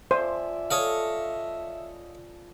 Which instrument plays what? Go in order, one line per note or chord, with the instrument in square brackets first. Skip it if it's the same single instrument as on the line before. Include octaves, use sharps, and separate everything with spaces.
[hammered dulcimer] F3 D5 G#5 [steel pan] C5 [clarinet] E5
[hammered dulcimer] A4 [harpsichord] C#5 D#5 F5